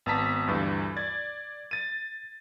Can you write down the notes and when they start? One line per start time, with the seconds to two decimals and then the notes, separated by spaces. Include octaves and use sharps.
0.06 G#1 B3 A5 A#5 B6
0.47 D2 G2 E3
0.97 D5 G#6 A6
1.71 A6 D#7